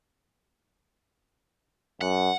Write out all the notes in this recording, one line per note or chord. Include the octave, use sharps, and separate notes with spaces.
F#2 F#5